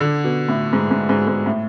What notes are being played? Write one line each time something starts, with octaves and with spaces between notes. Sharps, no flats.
D3
B2
A2
G#2
G#2
G#2
G#2
A2